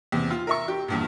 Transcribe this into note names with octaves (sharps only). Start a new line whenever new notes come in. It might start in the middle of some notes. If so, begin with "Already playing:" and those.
E2 C3
F4
A#4 E5 C#6
G4
E2 G2 A#2